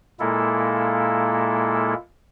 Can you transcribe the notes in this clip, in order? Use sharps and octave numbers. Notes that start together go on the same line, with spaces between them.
A#2 G#3 A#3 E4 A4